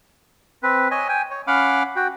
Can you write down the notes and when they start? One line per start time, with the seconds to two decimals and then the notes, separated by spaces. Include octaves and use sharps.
0.63 C4 B4
0.91 C#5 D#5 G#5
1.09 G5 G#5
1.31 C#5
1.47 C#4 F5 F#5 B5 D6 F6
1.96 F#4 G5